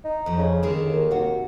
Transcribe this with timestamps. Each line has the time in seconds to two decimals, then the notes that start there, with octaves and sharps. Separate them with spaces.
0.04 D#4
0.26 F2 F3
0.38 C#3
0.63 D3 D#3 G#4
0.86 D#2
1.11 C3 F#4